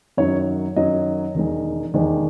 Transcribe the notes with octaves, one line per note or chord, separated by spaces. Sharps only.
F#2 D#3 F#3 C#5
F#2 D#3 F#3 D#5
E1 D#2 D#3 G#3
E1 D#2 D#3 G#3